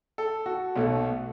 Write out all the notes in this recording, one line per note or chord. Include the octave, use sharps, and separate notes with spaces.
A4
F#4
B1 B2 A3